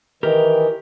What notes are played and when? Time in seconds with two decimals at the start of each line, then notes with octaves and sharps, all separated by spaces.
0.23 D#3 E3 G4 A#4